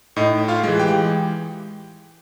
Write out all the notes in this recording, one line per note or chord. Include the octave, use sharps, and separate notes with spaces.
A2 D#4 D#5
F4 F5
E3 G#3
G4 G5